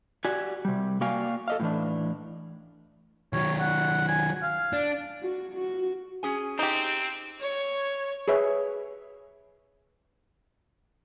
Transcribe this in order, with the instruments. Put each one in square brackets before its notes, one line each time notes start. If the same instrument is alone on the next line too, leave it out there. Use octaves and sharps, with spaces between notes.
[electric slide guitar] F#4 G4 D5 G#5
C3 G3
A#3 F#4 D5 F5 G5 G#5
A4 D#5 F5
A2 E3 D4
[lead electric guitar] D#3 F#3 [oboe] C#5
[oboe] F#5
G#5
F5
[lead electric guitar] D4
[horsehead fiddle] F#4
F#4
[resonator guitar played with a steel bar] C#4 G#4 G#5
[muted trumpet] C4 [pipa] D#4 G4
[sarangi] C#5
[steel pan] G#4 B4 C#5 E5